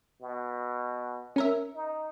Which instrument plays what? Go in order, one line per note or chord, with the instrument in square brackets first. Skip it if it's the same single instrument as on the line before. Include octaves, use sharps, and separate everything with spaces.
[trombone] B2
[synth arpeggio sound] C#4 A#4 E5
[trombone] D#4